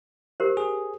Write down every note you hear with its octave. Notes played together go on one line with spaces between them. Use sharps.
G4 A#4 C5
G#4